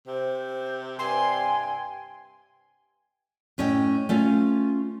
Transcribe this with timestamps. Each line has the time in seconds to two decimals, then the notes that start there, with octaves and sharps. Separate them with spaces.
0.07 C3 C5
0.99 G2 C3 G5 G#5 C6
3.58 A2 C#4 D#5 F#5 G5
4.09 A3 C#4 F4